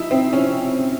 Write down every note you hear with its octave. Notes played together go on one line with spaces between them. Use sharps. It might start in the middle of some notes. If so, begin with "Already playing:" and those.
Already playing: F3 D#4 E4
C4
F3 C#4